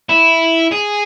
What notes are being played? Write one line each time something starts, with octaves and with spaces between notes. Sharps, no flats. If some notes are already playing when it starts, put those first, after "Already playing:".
E4
G#4